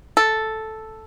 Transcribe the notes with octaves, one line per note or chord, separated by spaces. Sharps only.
A4